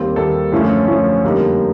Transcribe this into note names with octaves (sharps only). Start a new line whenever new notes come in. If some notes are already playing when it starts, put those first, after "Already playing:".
Already playing: D#2 D#3 G3 C4
D#2 D#3 G3 C4 A4
F#2 D3 F3 A3 C#4
F#2 D3 F3 A3 C#4
F2 D3 G3 A#3 D#4